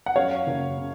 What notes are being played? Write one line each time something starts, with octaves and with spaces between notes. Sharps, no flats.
F#5
F#2 C#5 F5
F#1
C#3